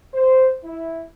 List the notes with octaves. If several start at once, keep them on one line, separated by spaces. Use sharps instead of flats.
C5
E4